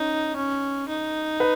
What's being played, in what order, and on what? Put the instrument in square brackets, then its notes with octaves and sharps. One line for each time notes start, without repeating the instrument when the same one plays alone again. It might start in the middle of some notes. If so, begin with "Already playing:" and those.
Already playing: [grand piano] C#4 [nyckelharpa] D#4
[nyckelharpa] C#4
D#4
[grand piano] B4